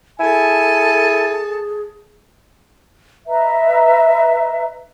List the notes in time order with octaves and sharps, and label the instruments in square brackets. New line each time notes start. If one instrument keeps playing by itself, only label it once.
[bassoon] E4 [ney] G#4 [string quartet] A4 A5 [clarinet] G#5
[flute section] B4 D#5 E5 A#5